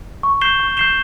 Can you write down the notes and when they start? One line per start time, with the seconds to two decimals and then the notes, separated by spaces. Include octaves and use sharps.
0.23 C#6
0.41 G6 C7 E7 G7
0.59 C#6
0.77 G6 C7 E7 G7